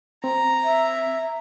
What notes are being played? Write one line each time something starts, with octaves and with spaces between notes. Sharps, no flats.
C4 A#5
E5